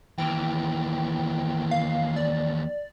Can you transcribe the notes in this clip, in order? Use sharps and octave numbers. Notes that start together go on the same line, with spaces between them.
D#2 E3 G5
F5
D5